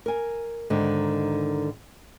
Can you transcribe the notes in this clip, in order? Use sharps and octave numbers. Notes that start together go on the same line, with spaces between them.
A#4 G#5
G#2 D3 D#3